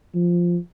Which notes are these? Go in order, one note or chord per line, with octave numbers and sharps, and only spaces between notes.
F3